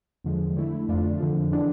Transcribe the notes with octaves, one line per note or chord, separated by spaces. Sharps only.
E2 D3 F3 G#3
D3 A3 E4
F2 D3 A3 D4 F4
F2 D3 F3
E3 G#3 D4